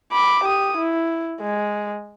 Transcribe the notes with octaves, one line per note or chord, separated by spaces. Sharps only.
B5 D6
G4 D#6
E4
G#3